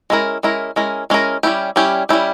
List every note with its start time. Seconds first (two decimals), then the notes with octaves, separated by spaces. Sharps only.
0.10 G#3 C#4 E4 A#4
0.43 G#3 C#4 E4 A#4
0.76 G#3 C#4 E4 A#4
1.10 G#3 C#4 E4 A#4
1.43 G3 C#4 E4 G4
1.76 G3 C#4 E4 G4
2.09 G3 C#4 E4 G4